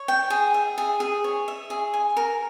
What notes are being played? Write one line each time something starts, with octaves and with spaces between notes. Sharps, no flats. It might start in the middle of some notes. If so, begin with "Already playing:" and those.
Already playing: C#5
G5
G#4
E5
G#4
G#4
C#5
E5
G#4
G#5
A#4